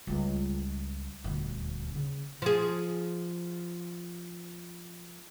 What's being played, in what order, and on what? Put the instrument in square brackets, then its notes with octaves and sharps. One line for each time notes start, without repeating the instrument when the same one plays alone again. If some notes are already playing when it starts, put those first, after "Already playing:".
[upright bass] C#2 G3
D#1 D2
C#3
[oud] F3 G#4